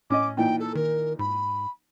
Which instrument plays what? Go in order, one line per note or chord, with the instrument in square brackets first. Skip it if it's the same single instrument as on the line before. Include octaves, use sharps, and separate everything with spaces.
[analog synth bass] A2 [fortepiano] C#4 D#5 [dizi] D6
[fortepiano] A#2 E3 D#4 [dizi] G5
[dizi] A4
[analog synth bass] D#3 [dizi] A#4
[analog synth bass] G#2 [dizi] B5